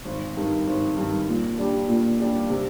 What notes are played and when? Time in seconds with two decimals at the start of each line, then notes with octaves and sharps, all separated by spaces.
0.05 G#1
0.36 G2 D#3
0.67 G#1
0.97 G2 D#3
1.28 A#2
1.58 G3 D4 G4
1.88 A#2
2.19 G3 D4 G4
2.50 C3